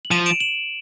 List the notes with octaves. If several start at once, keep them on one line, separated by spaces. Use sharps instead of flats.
F#7
F3 D#7 F7
D7 E7
E7 F#7